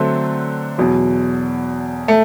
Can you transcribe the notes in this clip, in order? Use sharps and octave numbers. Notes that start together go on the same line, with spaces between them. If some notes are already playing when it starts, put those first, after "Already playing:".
Already playing: D3 F#3 A3 C4
E2 B2 F#3
A3